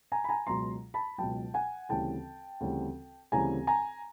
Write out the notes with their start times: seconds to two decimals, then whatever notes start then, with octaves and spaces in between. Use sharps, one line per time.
0.12 G#5 A#5
0.24 B5
0.29 G#5 A#5
0.47 C#2 B2 F#3 A#5 C6
0.94 A5 B5
1.18 C#2 B2 F#3 G5 A5
1.54 F#5 G#5
1.89 D2 C#3 E3 G3 C4 G5 A5
2.60 D2 C#3 E3 G3 C4
3.32 D2 C#3 E3 G3 C4 G#5 A#5
3.67 G#5 A#5